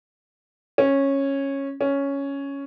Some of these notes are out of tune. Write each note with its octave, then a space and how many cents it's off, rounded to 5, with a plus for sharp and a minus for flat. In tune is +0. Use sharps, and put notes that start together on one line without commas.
C#4 -10
C#4 +5